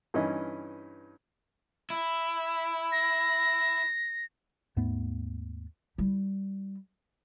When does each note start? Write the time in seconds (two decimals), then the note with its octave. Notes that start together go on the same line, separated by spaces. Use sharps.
0.14 G2 E3 C#4 D#4 D#5
1.90 E4
2.92 A#6
4.76 D#2 G#2 A3 B3
5.98 G3 E4